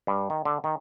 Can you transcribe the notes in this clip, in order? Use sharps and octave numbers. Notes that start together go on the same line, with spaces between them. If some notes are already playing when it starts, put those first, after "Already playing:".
G2
D#3
D3
D#3